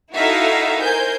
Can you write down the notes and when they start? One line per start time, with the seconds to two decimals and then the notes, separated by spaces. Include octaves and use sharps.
0.14 D#4 E4 F#4 A4 E5 F5
0.80 A#4 C5 G#5 G6